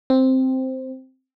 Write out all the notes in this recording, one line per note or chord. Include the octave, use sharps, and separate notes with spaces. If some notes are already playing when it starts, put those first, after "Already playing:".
C4